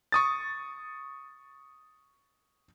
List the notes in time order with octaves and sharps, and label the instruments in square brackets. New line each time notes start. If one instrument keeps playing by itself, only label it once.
[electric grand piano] C#6 D#6 A6